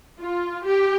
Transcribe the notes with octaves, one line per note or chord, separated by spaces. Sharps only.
F4
G4